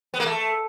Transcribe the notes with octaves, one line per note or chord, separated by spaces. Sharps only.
B3
A#3
A3